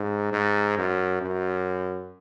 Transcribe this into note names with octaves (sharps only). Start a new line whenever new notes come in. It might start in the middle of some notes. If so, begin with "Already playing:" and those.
Already playing: G#2
G#2
F#2
F#2